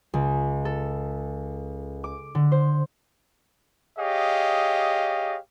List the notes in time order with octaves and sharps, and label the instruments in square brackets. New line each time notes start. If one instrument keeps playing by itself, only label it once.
[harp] C#2
A4
D6
D3
C5
[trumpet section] G4 G#4 C#5 D#5 F5